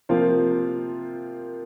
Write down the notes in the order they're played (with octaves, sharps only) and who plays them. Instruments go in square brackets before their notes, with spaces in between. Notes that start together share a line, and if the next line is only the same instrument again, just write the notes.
[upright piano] C3 F3 A#3 F4 C5